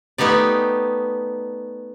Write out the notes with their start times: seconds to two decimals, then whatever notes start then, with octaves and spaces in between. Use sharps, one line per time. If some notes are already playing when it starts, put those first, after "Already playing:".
0.18 A3 B3 D#4 G4 D5